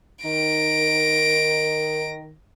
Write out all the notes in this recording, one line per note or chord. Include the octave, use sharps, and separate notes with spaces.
D#3 A#6 D7